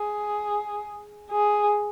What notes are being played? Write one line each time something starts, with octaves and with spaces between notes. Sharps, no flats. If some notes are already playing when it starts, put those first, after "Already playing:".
Already playing: G#4
G#4